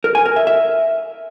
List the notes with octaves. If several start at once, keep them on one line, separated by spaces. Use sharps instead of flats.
A#4
G#5
A#4
E5
E5